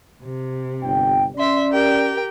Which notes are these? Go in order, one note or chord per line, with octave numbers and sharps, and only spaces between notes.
C3
G1 G5
C#4 D5 E5 C6
G4 A#4 G5